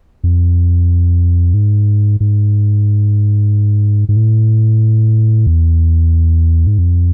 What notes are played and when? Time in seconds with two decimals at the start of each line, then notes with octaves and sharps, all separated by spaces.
0.24 F2
1.54 G#2
2.20 G#2
4.09 G#2
4.16 A2
5.47 E2
6.67 G#2
6.78 F2